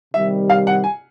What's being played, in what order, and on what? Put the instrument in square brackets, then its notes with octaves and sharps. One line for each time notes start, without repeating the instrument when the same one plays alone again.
[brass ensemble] C3 D#3 G3 [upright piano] E5
[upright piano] F5
F#5
G#5